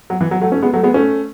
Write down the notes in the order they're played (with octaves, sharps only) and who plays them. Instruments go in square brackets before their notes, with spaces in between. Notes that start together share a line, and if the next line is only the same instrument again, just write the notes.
[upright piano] F#3
E3
F#3
F#3 A3
A3 C#4
G#3 B3
F#3 A3
G#3 B3
A3 C#4